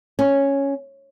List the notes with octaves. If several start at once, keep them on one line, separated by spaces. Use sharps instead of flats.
C#4